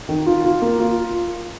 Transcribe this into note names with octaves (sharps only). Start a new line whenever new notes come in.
D#3
F4
F4
A#3
F4